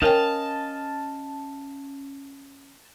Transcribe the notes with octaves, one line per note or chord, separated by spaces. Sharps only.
C#4 A#4 C#5 D#5 F5 G5 A5